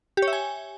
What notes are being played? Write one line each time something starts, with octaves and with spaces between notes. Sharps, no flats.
G4
C#5
E5
G#5